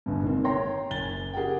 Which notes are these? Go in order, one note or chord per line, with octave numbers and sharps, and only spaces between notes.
G1 G2
C3 D#3 G#3 A#3 C4
C#5 G5 A#5 C6 A#6
F#1 G#5 A6 G7
G4 G#4 A#4 F#5 G5